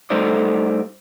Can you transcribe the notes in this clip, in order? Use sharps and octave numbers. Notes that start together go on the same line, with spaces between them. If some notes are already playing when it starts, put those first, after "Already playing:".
G3 A3 D#4 A4 C5 D5